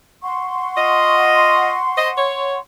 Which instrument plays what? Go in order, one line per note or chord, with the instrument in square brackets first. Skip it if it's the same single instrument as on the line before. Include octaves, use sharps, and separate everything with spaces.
[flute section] F#5 C6 C#6
[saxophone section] F4 D#5
C5 D#5
C#5